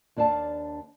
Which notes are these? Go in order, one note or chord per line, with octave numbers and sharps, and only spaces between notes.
D#2 D4 D5 F5 A5